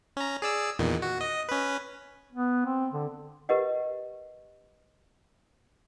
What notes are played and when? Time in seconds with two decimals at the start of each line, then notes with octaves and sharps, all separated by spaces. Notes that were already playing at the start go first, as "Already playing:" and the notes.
0.17 C#4 A#5
0.42 G#4 D5 E6
0.79 E2 A#2 D#3
1.02 F#4
1.21 D#5
1.49 C#4 B4
2.33 B3
2.66 C4
2.92 D3
3.49 G4 A#4 B4 D#5 F#5